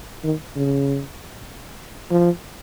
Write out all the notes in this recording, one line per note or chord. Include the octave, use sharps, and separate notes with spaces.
D#3
C#3
F3